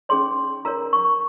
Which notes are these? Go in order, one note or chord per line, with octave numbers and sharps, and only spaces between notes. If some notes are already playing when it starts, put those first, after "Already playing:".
C#4 G#4 C#5 C6
F4 A#4 C#5 A#5
C#6